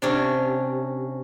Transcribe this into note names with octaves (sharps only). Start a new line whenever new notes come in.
C3 C#4 D4